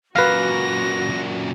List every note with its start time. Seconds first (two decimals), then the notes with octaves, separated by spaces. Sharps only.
0.16 F#2 A#2 F#4 B4 F5 A#6